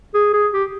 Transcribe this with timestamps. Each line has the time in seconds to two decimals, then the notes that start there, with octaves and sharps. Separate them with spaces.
0.14 G#4
0.33 G#4
0.53 G4